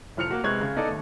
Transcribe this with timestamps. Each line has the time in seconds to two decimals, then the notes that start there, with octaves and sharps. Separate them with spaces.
0.17 F1 F3 F6 C#7 F7
0.31 A#3 F#4
0.44 C3 G#3 B4 C#6 F#6 G#6
0.61 C#3
0.76 B3 D#4 A4 D5
0.87 D#2 A3